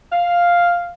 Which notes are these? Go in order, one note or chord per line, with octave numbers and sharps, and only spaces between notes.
F5